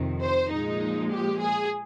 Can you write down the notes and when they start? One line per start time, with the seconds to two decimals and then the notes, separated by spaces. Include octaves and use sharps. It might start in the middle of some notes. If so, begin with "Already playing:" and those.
Already playing: F2 C3 D#3
0.22 C5
0.50 A#2 F3 G#3 D#4
1.11 G4
1.39 G#4